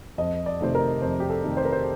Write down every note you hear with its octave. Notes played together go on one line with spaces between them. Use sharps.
F2 D#5
D5
C3 D#3 A3 C5
A#4
F2 C5
G4
A4
C3 D#3 A3
C5
A#4
C5